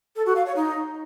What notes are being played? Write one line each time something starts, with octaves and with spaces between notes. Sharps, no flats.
A4
F#4
F5
C#5
D#4